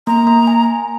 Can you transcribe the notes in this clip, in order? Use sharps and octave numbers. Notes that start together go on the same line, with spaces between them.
A#3 A#5
A#3
G#5